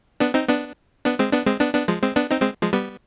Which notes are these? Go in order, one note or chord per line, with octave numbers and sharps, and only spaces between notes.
B3 D4
C4 D#4
B3 D4
B3 D4
G#3 C4
B3 D4
G#3 C4
B3 D4
B3 D4
F3 G#3
G#3 C4
B3 D4
C4 D#4
G#3 C4
F3 G#3
G3 B3